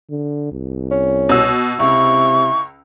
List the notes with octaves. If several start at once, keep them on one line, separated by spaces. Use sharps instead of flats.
D3
C2
C#4
B2 E6
C#2 C3 E4 C#6